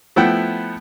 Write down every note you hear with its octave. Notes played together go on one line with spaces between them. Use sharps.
F3 A3 B3 E4 F#5 G5